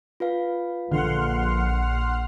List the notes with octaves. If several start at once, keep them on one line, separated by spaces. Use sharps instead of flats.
F4 B4 F5
A#1 D3 F#5 C6 F6